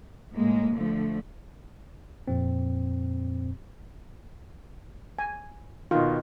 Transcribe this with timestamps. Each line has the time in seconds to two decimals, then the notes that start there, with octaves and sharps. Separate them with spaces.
0.33 A2 G#3 A#3
0.75 D3 F3 A3
2.28 F2 A#2 C4
5.19 G#5
5.91 B2 D#3 F4